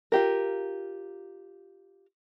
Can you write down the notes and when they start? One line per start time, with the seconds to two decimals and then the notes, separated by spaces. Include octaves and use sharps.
0.12 F4 G4 A#4